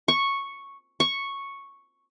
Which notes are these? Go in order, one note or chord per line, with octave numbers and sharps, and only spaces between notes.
C#6
C#6